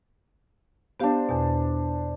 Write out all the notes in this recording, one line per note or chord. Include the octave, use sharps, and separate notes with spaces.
B3 D4 G4 C5 F5
E2 B2